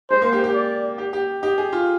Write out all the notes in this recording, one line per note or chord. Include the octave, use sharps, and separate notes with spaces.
G#3 C5
A#3
G4
G4
D5
G4
G4
G4 D#5
G#4
F4